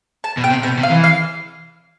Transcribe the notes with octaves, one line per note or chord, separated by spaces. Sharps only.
A5
B2
G5
C3
B2 G5
C3
F5
E3
F5